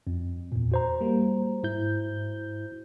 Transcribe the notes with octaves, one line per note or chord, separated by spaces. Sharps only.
F2
E2 A#2
F#4 C5 A#5
G3 A#3
G#2 E4 G6